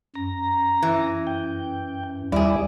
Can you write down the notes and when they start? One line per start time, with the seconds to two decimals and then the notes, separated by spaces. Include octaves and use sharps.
0.15 F#2 A#5
0.82 E3
1.27 G5
2.32 D#2 G3 E4 G#4 D5